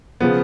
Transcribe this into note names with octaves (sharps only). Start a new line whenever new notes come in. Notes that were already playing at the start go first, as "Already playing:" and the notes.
C#3 F3 B3